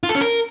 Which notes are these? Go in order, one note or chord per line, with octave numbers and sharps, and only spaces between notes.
F4
A4
C#4
A#4